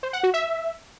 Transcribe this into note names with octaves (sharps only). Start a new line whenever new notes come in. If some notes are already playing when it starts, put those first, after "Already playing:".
C5
F#5
F#4
E5